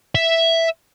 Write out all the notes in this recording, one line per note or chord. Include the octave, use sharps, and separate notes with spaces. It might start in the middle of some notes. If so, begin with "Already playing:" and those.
E5